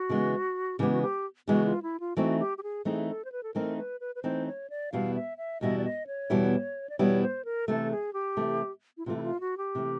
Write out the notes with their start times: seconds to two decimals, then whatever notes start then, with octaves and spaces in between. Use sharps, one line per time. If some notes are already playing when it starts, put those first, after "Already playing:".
Already playing: F#4
0.09 C#3 E3 G#3 B3
0.79 C#3 E3 G#3 B3 G4
0.92 F#4
1.02 G4
1.48 C#3 E3 G#3 B3 F#4
1.65 F4
1.83 E4
2.00 F4
2.17 E3 A3 C4 D#4 F#4
2.40 G4
2.58 G4
2.63 G#4
2.85 E3 A3 C4 D#4 G#4
3.09 A4
3.25 C5
3.32 B4
3.43 A4
3.54 E3 A3 C4 D#4 A#4
3.78 B4
4.01 B4
4.15 B4
4.23 E3 A3 C4 D#4 C5
4.46 C#5
4.70 D5
4.92 E2 B2 G3 B3 E4 F5
5.15 E5
5.38 E5
5.61 E2 B2 G3 B3 E4 D#5
5.78 D5
5.84 D#5
6.07 C#5
6.30 E2 B2 G3 B3 E4
6.90 D5
6.99 E2 B2 G3 B3 E4 C#5
7.22 C5
7.45 A#4
7.68 C3 E3 A3 A4
7.91 G#4
8.13 G4
8.37 C3 E3 A3
8.97 E4
9.06 C3 E3 A3 F4
9.17 E4
9.23 F4
9.40 F#4
9.57 G4
9.75 C3 E3 A3